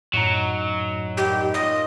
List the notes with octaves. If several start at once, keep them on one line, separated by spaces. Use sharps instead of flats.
F#2 A2 F#3 D#4 A#5
D#3 G3 G#3 G4
A#3 F4 D#5